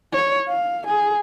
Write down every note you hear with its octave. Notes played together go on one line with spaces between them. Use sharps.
C#5
F5
G#4